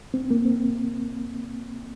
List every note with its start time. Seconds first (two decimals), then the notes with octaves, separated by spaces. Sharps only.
0.14 C4
0.31 A#3
0.45 C4